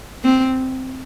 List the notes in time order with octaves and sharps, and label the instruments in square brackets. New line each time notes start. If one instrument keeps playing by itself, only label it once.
[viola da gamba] C4